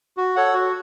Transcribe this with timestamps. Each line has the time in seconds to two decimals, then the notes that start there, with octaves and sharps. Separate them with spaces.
0.17 F#4
0.36 A4 C#5 F#5
0.54 F#4